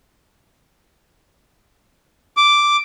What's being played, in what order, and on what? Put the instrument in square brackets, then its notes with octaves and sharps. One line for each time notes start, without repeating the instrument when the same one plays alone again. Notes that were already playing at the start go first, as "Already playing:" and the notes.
[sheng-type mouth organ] D6